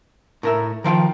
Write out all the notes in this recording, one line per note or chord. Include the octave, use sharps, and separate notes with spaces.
A2 A#4 E5
D#3 F3 F5 G5